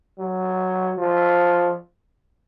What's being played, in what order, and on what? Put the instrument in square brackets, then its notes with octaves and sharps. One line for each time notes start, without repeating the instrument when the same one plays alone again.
[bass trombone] F#3
F3